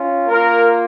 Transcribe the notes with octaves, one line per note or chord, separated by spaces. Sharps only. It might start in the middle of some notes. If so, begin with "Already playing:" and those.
Already playing: C#4 F4
A#3 F4 A#4